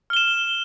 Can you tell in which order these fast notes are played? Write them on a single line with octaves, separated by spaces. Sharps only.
F6 G7 E7